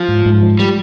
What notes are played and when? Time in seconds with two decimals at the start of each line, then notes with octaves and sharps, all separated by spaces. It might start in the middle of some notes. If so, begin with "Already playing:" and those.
Already playing: F3
0.08 G#2
0.26 G#2
0.42 F3
0.59 G3